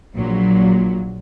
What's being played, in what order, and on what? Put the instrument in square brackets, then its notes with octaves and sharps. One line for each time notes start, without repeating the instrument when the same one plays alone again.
[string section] A#1 A#2 F#3